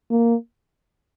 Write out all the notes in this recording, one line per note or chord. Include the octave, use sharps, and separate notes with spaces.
A#3